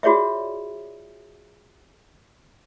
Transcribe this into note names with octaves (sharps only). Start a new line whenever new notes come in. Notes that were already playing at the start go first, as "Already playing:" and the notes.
F4 F#4 G#4 C#5 D5 E5